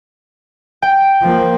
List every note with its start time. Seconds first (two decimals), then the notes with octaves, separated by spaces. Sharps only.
0.82 G5
1.21 F3 A#3